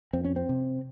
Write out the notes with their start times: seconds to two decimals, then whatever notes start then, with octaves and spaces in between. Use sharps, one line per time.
0.13 F2 C4
0.25 C#4
0.36 C4
0.49 C3